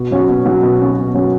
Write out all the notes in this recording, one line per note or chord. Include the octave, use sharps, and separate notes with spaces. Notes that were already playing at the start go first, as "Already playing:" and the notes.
Already playing: B2
F#3 C#4 F#4
B2
F#3 C#4 F#4
B2
F#3 C#4 F#4
B2
F#3 C#4 F#4